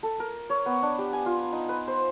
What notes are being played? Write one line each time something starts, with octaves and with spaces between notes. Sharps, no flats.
A4
A#4
C#5
B3
D4
G4
G#5
F4
D#4
B4
C5